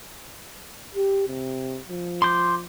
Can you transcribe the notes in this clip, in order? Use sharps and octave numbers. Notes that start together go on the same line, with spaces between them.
G4
C3
F3
C6 D6 G6